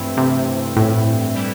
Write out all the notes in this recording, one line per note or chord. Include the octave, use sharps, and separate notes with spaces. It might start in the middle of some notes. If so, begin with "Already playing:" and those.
Already playing: G2 E3 A3 C4 E4
C3
A2
E3 G3